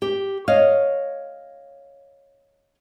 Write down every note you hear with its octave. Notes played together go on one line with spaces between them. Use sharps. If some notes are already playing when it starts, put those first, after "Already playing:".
G4
C#5 D#5 F5